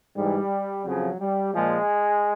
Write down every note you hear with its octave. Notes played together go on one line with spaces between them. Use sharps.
G#2 E3 G3
F2 C#3 F3 F#3
G3
A#2 F3 G#3